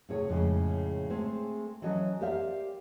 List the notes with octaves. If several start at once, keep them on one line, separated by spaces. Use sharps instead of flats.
A2 C3 G#4 C#5
F2 A2 C#3 G#3
G#3 A3 C4 G#4 C5
E3 F#3 C#4 A4 D#5
G4 A#4 C5 D5 E5 F5